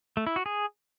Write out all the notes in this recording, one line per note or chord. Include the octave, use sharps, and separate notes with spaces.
A3
E4
F#4
G#4